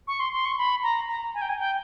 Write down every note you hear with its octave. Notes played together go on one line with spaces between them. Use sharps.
C#6
C6
C6
C#6
C6
B5
A#5
A#5
G#5
G5
G#5
G5